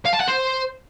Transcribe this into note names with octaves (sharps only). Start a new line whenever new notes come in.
F5
A5
F#5
C5